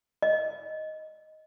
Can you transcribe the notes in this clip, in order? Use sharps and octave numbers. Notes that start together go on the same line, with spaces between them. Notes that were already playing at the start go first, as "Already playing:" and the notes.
D#5